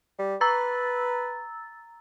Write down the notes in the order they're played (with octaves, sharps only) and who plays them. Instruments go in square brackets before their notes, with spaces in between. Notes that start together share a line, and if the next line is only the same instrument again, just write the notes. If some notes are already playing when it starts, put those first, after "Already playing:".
[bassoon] G3
[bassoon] B4 [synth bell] A#5 E6 A6